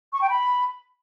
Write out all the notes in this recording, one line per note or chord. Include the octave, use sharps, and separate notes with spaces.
C#6
G5
B5